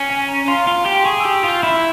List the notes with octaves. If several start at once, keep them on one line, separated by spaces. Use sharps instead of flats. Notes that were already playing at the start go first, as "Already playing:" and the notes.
Already playing: C#4
G#5
A#5
F4 C6
F4
G4
G#4 C#6
G4 E6
F4 G6
E4